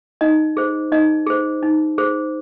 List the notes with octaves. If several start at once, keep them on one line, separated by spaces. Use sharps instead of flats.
D#4 D#5
G#4 C5
D#4 D#5
G#4 C5
D#4
G#4 C5